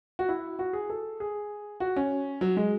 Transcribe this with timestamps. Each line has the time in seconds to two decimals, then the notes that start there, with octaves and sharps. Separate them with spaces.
0.19 F#4
0.29 E4
0.59 F#4
0.73 G#4
0.90 A4
1.20 G#4
1.80 F#4
1.96 C#4
2.41 F#3
2.57 G#3